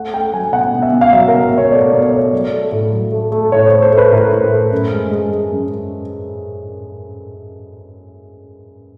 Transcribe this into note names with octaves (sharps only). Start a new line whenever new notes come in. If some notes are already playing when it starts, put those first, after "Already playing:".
Already playing: A3 F#5
A3 G5
F#3 G#5
B2 F#5
B2
E5
B2
F5
F#3 E5
A#4
B2
B2 C#5
A3 D5
B2
C#5
A3
F#3 D5
A3
A2
F#3
A3
A3
A2 C#5
C5
A3
C5
A3
B4
A2 A#4
A2
A3
F#2
G#3
G#3
G#3
F#2